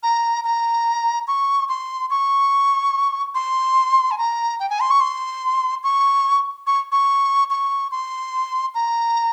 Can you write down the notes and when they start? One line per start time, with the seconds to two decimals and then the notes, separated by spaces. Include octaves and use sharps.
0.03 A#5
0.44 A#5
1.28 C#6
1.69 C6
2.10 C#6
3.35 C6
4.11 G#5
4.18 A#5
4.60 G5
4.70 G#5
4.80 C6
4.90 C#6
5.01 C6
5.84 C#6
6.67 C#6
6.92 C#6
7.50 C#6
7.91 C6
8.75 A#5